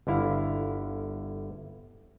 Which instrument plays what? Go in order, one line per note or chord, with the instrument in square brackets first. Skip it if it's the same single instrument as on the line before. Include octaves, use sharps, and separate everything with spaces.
[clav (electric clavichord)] G1 D3 E4 F5